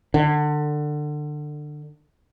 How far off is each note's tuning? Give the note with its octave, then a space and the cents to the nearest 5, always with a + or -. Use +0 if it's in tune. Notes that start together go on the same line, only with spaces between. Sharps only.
D3 +25